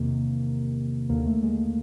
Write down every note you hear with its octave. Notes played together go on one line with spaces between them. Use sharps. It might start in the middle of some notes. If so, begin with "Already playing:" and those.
Already playing: E2 C3 D#3 A#3
D#2 D3 A#3
A3
G#3